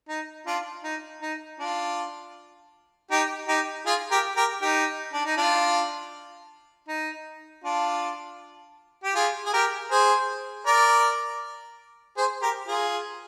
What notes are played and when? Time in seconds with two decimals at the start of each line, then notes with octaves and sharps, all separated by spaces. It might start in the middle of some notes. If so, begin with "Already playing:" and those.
0.09 D#4
0.47 D4 F4
0.84 D#4
1.22 D#4
1.60 D4 F4
3.11 D#4 G4
3.48 D#4 G4
3.86 F4 G#4
4.11 G4 A#4
4.37 G4 A#4
4.62 D#4 G4
5.13 D4
5.26 D#4
5.37 D4 F4
6.88 D#4
7.64 D4 F4
9.04 G4
9.15 F4 G#4
9.46 G#4
9.54 G4 A#4
9.91 G#4 C5
10.67 A#4 D5
12.17 G#4 C5
12.42 G4 A#4
12.68 F4 G#4